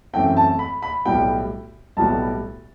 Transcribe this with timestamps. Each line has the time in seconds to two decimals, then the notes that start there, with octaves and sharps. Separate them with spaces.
0.13 F#2 E3 A3 C4 G5
0.37 A5
0.59 B5
0.82 B5
1.05 B1 A2 G3 B3 G5
1.97 B1 A2 G3 B3 A5